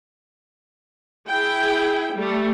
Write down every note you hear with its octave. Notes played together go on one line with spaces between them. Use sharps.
E4 G#4 G5
G3 A3